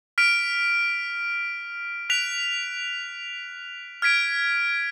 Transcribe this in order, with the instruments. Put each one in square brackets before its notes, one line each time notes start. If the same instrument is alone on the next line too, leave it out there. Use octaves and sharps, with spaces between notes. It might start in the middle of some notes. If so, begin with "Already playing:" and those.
[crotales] F6 B6 D7 F7
F#6 B6 D7 F7
F6 G#6 B6 D7